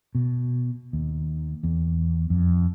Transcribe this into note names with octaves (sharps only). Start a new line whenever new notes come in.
B2
D#2
E2
F2